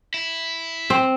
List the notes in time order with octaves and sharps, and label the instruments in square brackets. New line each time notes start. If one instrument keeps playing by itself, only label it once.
[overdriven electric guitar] E4
[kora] C4